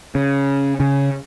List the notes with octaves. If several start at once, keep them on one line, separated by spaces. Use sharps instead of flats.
C#3
C#3